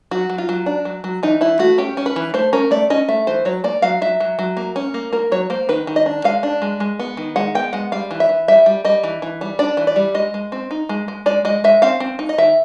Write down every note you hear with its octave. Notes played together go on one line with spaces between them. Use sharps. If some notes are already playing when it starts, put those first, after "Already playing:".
F#3 F#4
F#3
F4
F#3
D4
F#3
F#3
E3 D#4
E3 E4
A3 F#4
C#4 G4
C#4
B4
E3
A3 C5
C#4 A#4
A3 D5
C#4 D#5
A3 E5
E3 C5
F#3 C#5
A#3 D5
F#3 F5
F#3 E5
F#3
F#3
A#3
C#4
A#3
A#3 A#4
F#3 C#5
A#3 C5
D#3 B4
D#3
D#5
D4
G#3 F5
D4
G#3
G#3
B3
D#3
G#3 F#5
B3 G5
G#3 F#5
G3 F5
E3
E5
E3
G3 E5
G3
G3 D#5
E3
E3
G3
D4 D5
E3
D5
G3
G#3 D#5
G#3
C4
D#4
G#3
G#3
G#3 D5
G#3 D#5
G#3 E5
C4 F5
C4
D#4
D#5
D#3 E5